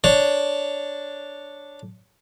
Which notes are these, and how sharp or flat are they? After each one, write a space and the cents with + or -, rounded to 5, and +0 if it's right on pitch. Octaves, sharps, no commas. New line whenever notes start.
D4 +0 C#5 +0